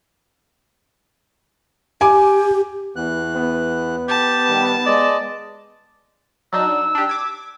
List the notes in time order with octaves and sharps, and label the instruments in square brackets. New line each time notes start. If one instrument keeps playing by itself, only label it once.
[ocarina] G4 [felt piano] G#5 D6
[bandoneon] E2 E3 F#6 [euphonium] B3
[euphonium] B3
[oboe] G4 [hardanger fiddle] A5
[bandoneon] D#3 G3
[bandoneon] G#3 D#5 [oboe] D5
[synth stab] F#3 D4 D#4 [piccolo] E6
[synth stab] D4 G4
D6 G#6